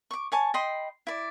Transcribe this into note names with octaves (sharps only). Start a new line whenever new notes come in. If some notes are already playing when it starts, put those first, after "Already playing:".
C#6 D6
C#5 G#5 A5
D#5 G5 B5 C6
E4 D5